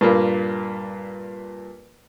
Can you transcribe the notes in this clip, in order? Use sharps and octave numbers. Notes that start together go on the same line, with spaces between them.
G2 A#2 A#3